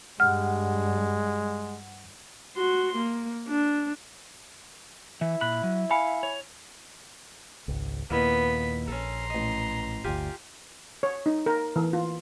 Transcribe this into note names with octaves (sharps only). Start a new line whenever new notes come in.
G2 G3 G#3 F#5 F6
F#4 C6
A#3
D4
E3 E4
A#2 B5 F#6
F#3
F5 G#5 B5 C#7
C#5
G#1 C#2
D#2 A#2 A#3 B3 E4 D#5 B6
A#1 C#4 A4 A#5 C6
A1 D#5
G1 D2 F4 G4 G#5
C#5
D#4
A#4
E3
F4